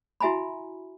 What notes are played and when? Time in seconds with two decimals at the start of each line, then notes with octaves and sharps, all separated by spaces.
0.21 E4 F#4 E5 G#5 A#5 B5